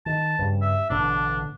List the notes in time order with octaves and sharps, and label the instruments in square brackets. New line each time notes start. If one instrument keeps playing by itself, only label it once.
[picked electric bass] D#3 [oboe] A5
[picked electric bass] G2 C#3 G3
[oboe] E5
[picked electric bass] A1 B2 D3 [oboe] D4